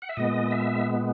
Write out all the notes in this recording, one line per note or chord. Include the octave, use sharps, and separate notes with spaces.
F#5
E5
A#2 G#3 B3 D#5
E5